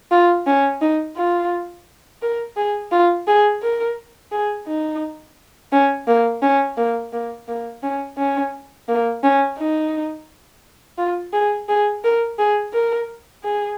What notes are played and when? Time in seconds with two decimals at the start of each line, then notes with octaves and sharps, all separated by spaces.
0.11 F4
0.47 C#4
0.81 D#4
1.17 F4
2.22 A#4
2.57 G#4
2.92 F4
3.27 G#4
3.62 A#4
4.32 G#4
4.67 D#4
5.72 C#4
6.07 A#3
6.42 C#4
6.77 A#3
7.13 A#3
7.48 A#3
7.83 C#4
8.18 C#4
8.89 A#3
9.23 C#4
9.59 D#4
10.98 F4
11.33 G#4
11.69 G#4
12.04 A#4
12.39 G#4
12.74 A#4
13.44 G#4